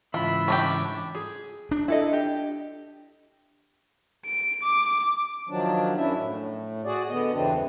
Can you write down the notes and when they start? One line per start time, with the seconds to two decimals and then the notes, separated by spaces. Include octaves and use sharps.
0.14 G#2 C#3 E3 F4 E5 B5
0.48 C#4 D4 G4
1.15 G#4
1.71 D4
1.88 E4 A4 D#5
2.13 G4
4.26 D7
4.63 D6
5.49 D#3 F3 F#3 D4
5.97 F#2 C#4 D4 E4 E5
6.15 A2
6.85 F#4 G#4 D5
7.10 D3 B3 D#5
7.33 E2 G2 C#3 E3 C4 D4